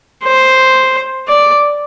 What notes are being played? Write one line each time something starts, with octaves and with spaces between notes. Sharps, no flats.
C5
D5